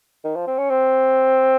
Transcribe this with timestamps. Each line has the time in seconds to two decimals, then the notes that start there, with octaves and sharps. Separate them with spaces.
0.24 D#3
0.36 F3
0.47 C4
0.58 C#4
0.70 C4